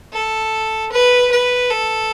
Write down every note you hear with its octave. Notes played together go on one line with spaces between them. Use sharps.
A4
B4
B4
A4